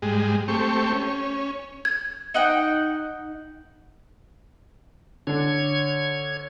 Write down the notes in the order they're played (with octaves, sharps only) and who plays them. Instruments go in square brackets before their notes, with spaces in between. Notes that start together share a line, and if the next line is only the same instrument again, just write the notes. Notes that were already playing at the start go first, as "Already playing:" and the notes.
[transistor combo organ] G#2 G3 G#3
A3 C4 G4 C#6
C#4
[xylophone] G#6
[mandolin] D#4 F#5 G5
[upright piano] D3 D4 [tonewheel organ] C#5 G#6